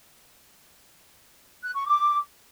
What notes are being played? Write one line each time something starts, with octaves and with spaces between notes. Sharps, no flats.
F#6
C#6
D6